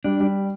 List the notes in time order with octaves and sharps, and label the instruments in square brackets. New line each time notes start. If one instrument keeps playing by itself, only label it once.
[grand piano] G3 [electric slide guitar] D4
[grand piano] G3